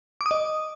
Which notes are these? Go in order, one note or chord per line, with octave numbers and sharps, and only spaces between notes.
D6
D#6
D#5